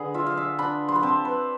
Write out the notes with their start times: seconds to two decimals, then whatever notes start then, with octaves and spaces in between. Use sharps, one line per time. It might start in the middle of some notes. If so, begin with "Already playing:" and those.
Already playing: D3 G#4 B4
0.14 F4 E5
0.26 F5
0.37 E5
0.59 D4 B5
0.89 C6
0.96 B5
1.03 C4 A5
1.25 B4